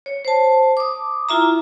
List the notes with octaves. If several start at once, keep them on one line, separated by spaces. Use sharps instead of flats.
C#5
C5 A5
D6 D#6
E4 F4 E5 A#5